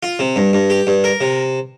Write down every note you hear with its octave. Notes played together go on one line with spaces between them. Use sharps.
F4
C3
G2
G2
G4
G2
A#4
C3